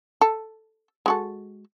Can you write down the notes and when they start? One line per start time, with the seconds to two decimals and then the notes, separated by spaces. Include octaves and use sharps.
0.21 A4
1.06 G#3 F#4 A4